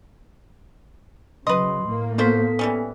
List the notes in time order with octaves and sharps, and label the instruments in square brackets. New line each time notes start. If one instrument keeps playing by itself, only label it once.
[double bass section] C#3 F#3 [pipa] B4 D#5 [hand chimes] C6
[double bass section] A2 A#3
[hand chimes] B3 A4 B6 [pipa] F4 F#4 C5
[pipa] E3 G3 C#4